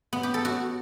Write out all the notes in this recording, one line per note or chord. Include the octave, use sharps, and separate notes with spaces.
B3
G4
A4
F#4